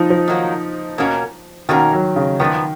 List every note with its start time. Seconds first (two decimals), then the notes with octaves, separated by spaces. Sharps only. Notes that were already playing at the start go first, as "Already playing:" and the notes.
Already playing: F3 D#4
0.10 F3
0.28 D#3 F#3 A#3
0.98 B2 A#3 C#4 F#4 A#4
1.69 B2 D#3 A#3 C#4 F#4 A#4
1.93 F#3
2.16 C#3
2.40 A#2 D#3 F3 B3